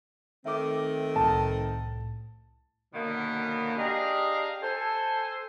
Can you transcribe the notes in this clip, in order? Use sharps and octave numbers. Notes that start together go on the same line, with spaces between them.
D#3 A3 C4 E5 D6
C2 A2 A5
B2 D3 D#3 A#3 B3 C#4
D4 G4 G#4 D#5 F5 A#5
A4 C5 G#5